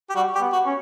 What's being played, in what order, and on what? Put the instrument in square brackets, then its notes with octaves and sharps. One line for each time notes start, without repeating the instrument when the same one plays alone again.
[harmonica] G4
[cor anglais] G3 [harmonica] F#4
[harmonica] G4
[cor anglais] B3
[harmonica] F#4
[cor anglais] C#4